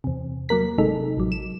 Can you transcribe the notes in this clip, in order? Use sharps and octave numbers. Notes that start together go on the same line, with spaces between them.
E2 C3
F#3 A#3 A#4 B6
G#1 C3 G#3 D#4 A4
A1 F#3
E7